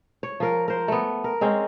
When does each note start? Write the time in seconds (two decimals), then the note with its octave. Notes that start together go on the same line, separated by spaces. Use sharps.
0.23 C#5
0.40 F3 A#4
0.68 A#4 C5
0.88 A3 B3
1.24 A#4
1.41 G#3 C4 C#4